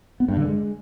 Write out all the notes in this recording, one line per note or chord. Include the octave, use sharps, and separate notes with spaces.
B3
G2
D3
G#3